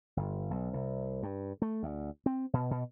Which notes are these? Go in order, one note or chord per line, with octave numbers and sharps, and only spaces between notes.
G1
B1
C2
G2
A3
D2
C4
B2
B2